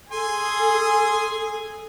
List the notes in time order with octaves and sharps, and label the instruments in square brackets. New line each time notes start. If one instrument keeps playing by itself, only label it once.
[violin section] G#4 [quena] A4 [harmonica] G#5 C6